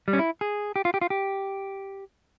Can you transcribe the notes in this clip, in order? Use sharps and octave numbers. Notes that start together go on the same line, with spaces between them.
G3
C#4
E4
G#4
G4
F4
G4
F4
G4